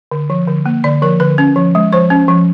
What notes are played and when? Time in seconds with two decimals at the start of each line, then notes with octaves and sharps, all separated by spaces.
0.11 D3
0.30 F3
0.47 D3
0.66 A#3
0.84 D3 D5
1.02 F3 A#4
1.20 D3 B4
1.38 C#4
1.56 F3
1.75 G#3
1.93 F3 C5
2.10 C#4
2.28 F3